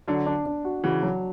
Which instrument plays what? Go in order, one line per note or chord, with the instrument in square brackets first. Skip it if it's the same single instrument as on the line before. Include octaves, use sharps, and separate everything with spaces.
[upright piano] D3 F#3 [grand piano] D4
[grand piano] D4
D4
F#4
[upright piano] C#3 E3 [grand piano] F#4
[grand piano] F#3